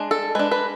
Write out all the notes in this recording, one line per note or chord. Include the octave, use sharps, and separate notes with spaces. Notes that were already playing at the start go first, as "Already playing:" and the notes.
Already playing: G#3 D4
A4
G#3 D4 B4
B4